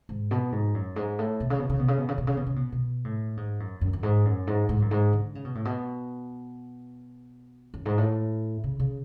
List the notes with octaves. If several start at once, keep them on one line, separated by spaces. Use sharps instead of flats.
G#2
B2
G#2
F#2
G#2
A2
B2
C#3
B2
C#3
B2
C#3
B2
C#3
B2
C#3
B2
C#3
B2
B2
A2
G#2
F#2
F#2
F#2
G#2
F#2
G#2
G#2
F#2
G#2
D3
C#3
B2
A2
B2
F#2
G#2
A2
C#3
C#3